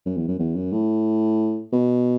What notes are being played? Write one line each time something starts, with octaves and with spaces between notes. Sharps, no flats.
F#2
E2
F#2
E2
F#2
A2
B2